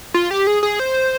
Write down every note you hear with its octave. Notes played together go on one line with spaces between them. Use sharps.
F4
G4
G#4
G#4
C5